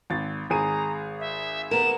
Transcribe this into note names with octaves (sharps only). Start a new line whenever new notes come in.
G#1 A6
G#1 G#4 A#5 D#7
E5
B3 A#4 E7